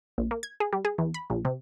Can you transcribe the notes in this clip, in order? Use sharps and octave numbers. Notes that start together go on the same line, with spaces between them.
A#1
A#3
G#6
G#4
G3
G#4
E2
B5
A#1
C3